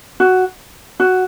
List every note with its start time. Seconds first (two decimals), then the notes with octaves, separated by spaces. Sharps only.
0.20 F#4
1.00 F#4